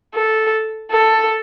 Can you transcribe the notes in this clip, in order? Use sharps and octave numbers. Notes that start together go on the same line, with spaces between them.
A4
A4